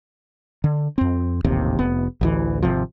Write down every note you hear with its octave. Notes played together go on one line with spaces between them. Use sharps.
D3
F2 C4
D#1 A1 D#2 C3
F1 B3
A1 D2 E3
G#1 C#2 C3 F3